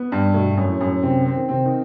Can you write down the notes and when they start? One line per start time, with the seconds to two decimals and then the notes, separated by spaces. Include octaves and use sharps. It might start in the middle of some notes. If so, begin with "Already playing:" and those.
Already playing: B3
0.12 G2
0.34 B2 A3
0.52 G2
0.57 F#2
0.69 A2
0.81 F#2
0.86 A2
1.03 C3 C4
1.25 C4
1.37 D#3
1.49 C3 C4
1.65 D#3